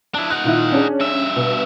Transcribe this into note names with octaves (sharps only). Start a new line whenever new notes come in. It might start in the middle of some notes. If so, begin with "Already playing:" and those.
D4 E4 A5
D#4 F#5 F#6
A#2 D#3 E4
C#4 D4 G#4
G2 E5
B2